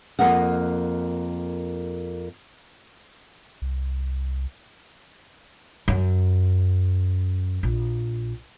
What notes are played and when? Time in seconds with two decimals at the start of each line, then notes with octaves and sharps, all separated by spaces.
0.19 F2 G#3 A#3 A#4 D#5 F#5
3.62 C2
5.88 F#2
7.63 A#1